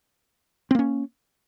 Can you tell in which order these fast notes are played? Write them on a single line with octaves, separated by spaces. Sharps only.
C4 A#3 C#4